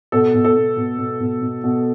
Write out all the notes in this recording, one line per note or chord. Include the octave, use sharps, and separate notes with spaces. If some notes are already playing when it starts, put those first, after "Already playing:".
B2 A4
B2
A4
B2
B2
B2
B2
B2
B2